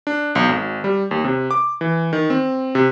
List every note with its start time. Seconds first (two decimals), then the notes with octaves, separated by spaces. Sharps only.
0.07 D4
0.35 B1
0.49 G#1
0.84 G3
1.11 D#2
1.24 C3
1.51 D6
1.81 E3
2.13 D#3
2.30 C4
2.75 C3